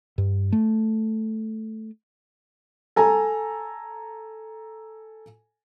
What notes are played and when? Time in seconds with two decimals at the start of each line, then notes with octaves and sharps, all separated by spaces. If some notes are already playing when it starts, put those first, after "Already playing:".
0.18 G2
0.52 A3
2.96 A4 G#5 A#5